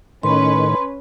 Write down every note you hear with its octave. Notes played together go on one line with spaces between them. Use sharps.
A2 D#3 C#4 B4 C6